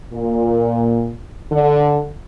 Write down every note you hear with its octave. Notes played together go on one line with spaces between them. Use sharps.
A#2
D3